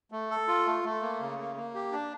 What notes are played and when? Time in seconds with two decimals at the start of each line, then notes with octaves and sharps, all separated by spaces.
0.12 A3
0.30 A4
0.48 F4
0.66 A3
0.84 A3
1.02 A#3
1.20 C#3
1.38 A#3
1.56 A#3
1.74 G4
1.92 D4